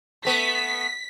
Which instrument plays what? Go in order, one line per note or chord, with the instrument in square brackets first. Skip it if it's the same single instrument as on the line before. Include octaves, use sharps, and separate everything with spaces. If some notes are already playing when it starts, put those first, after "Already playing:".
[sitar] A3 B3 [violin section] B6